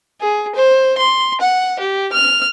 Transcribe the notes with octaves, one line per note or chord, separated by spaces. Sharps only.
G#4
C5
C6
F#5
G4
F6